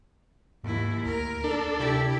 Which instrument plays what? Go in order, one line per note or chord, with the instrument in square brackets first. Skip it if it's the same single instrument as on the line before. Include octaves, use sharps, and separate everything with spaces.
[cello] D#2 E4 [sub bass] G#2
[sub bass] D2 [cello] A#4
[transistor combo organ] D4 A4
[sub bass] C3 [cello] E4 G4